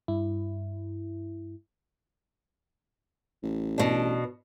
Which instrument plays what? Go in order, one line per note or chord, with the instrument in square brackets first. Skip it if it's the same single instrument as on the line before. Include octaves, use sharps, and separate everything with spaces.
[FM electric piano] G2 E4
[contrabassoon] A1
[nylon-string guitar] B2 D4